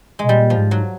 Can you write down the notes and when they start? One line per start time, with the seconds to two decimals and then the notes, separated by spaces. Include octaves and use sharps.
0.19 B2 G#3
0.29 A#2 G3
0.50 F3
0.57 G#2
0.71 F#3